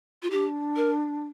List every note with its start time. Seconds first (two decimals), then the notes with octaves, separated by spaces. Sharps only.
0.23 F4
0.30 D4 E4 G4
0.76 A#4